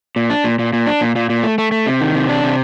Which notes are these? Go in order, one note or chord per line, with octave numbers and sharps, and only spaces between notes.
A#2
D4
A#2
A#2
A#2
D4
A#2
A#2
A#2
A3
A3
A3
C3
D#3
C3
D4
C3